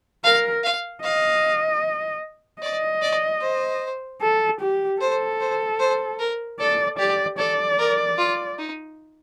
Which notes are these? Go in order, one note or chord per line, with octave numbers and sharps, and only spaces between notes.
A#4 F5
F5
D#5 F5
D5 D#5
D5
C5
A4
G4
A4 C5
C5
C5
A#4
A4 D5
G4 D5
A4 D5
A#4
F4
D#4